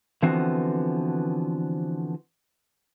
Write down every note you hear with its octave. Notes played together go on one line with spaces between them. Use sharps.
D3 E3 F3 B3 C4 F#4